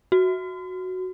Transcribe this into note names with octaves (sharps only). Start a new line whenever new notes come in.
F#4